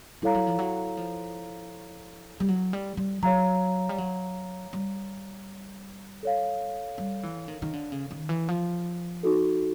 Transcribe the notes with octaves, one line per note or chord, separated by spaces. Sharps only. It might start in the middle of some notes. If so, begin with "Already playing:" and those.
G3 E4 A4 C#5 F5 A#5
F#3
F3
F#3
F3
G3
F#3
G3
G3
F#3 C#5 F5 A#5
G3
F#3
G3
A4 C#5 F5
G3
E3
D#3
D#3
D3
C#3
D#3
E3
F3
D#4 F#4 A4